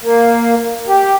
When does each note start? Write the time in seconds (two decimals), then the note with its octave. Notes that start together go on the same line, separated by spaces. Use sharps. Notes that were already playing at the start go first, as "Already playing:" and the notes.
0.02 A#3
0.88 G4